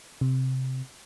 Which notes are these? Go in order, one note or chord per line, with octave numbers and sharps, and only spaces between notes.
C3